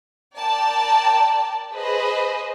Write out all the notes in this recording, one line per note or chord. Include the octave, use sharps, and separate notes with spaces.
A#4 D5 G5 A5
G#4 B4 C5 D#5